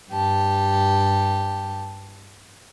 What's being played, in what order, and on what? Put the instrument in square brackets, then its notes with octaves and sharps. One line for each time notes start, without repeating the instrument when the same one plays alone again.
[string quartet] G2 G4 A5